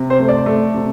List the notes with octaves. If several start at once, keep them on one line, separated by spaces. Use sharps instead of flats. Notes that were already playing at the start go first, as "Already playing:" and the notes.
Already playing: C3
C5
A3
D5
A3
C3